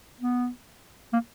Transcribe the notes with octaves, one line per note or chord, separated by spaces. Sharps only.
B3
A#3